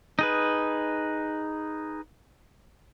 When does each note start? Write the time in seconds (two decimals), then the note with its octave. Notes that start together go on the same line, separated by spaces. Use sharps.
0.19 D#4 G#4 B4